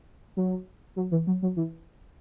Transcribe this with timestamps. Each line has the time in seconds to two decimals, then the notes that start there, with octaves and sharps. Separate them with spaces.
0.37 F#3
0.96 F#3
1.11 E3
1.27 F#3
1.42 F#3
1.56 E3